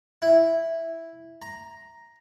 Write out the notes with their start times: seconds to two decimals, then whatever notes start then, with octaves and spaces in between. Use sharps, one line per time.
0.22 E4
1.42 A#5